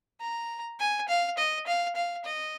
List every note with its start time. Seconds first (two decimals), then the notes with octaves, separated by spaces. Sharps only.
0.21 A#5
0.80 G#5
1.09 F5
1.38 D#5
1.67 F5
1.96 F5
2.25 D#5